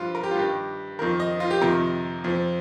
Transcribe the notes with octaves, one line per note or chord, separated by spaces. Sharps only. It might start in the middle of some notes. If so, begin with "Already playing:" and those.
Already playing: G2 F3 F4
A#4
G4
F4
G2 D#3 G4
F2 D#3 A#4
D#5
F4
G4
F2 C3 D#3 A#4
F2 F3